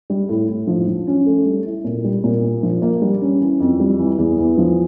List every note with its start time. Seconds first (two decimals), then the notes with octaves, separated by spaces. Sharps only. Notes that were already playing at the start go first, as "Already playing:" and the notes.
0.10 G3
0.29 A2
0.49 A2
0.67 F3
0.87 F3
1.07 C#4
1.26 A3
1.46 G3
1.65 E4
1.84 A#2
2.04 G3
2.24 A#2
2.43 A#3
2.63 F3
2.82 A#3
3.02 G3
3.21 C#4
3.41 E3
3.60 F2
3.80 G3
3.99 E3
4.18 E2
4.38 E3
4.58 F3